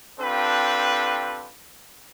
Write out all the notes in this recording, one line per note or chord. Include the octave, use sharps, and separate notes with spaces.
C4 D4 F4 G4 A4 B4